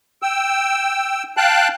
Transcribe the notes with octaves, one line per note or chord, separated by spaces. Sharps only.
G5 E6
F5 G5 A5 F#6